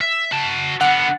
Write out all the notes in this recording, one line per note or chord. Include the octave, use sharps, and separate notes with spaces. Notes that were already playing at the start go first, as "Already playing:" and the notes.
E5
F#4 A5
D3 B3 F#5